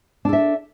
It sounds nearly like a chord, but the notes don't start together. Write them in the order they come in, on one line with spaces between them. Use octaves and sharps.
D4 A4 E5